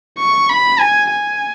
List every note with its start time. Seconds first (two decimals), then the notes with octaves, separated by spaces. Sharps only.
0.19 C#6
0.49 B5
0.80 G#5
1.10 G#5